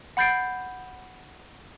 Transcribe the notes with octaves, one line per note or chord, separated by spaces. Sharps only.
F#5 B5 G6 A6 C7 D7